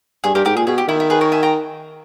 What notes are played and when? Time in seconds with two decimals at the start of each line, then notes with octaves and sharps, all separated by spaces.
0.24 G2 G#4
0.34 G2 G4 A#4
0.45 G#2 G4 A#4
0.56 A#2 G#4
0.67 B2 G#4
0.78 G4
0.88 D#3 E4
1.00 E4
1.10 G#4 B4
1.21 A#4 C#5
1.32 E5 G#5
1.43 G5 A#5